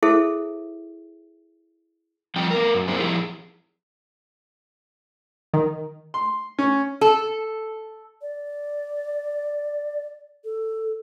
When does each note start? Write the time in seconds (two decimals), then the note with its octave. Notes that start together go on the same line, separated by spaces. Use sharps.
0.03 E4 G#4 A4 C5 E5
2.36 F3 G3 C4 G5
2.51 B3 A#4
2.75 F#2
2.88 A#3 C4 D#4 G#4 A#4 C5
3.00 F3 E4 G4 G#4
5.53 D#3
6.14 C6
6.59 C#4
7.01 A4
8.22 D5
10.45 A4